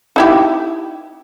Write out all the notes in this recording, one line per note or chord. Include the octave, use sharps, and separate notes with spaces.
D#4 E4 G4